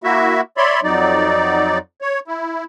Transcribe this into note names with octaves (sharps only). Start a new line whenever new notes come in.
A#3 E4 F#4 E5
C#5 D5 E5 B5 C6
F2 F#3 D#4 D5
C#5
E4